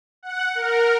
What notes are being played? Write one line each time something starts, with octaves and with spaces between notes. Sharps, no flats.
F#5
A#4